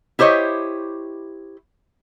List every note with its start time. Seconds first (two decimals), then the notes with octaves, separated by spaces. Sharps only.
0.19 E4 G4 C5 C#5 D#5